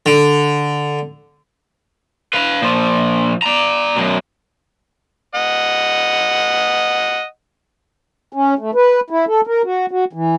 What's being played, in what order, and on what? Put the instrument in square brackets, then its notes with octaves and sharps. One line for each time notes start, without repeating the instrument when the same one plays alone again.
[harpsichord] D3
[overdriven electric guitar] B4 F5
A#2 F3
D5 A#5
F#2 B2
[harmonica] D#5 F#5
[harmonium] C#4
A3
B4
E4
A4
A#4
F#4
F#4
E3